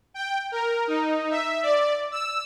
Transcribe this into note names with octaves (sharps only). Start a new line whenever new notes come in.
G5
A#4
D#4
E5
D5
E6